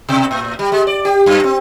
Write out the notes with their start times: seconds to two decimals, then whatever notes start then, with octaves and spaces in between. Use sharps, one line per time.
0.09 B2
0.31 A2
0.59 G3
0.72 G#3
0.87 D5
1.05 G4
1.26 F#2
1.44 C4